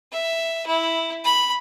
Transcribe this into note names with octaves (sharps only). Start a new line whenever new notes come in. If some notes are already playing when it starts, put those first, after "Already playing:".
E5
E4
B5